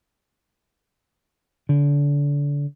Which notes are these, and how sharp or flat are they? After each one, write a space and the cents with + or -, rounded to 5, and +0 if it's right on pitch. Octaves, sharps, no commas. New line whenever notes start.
D3 -30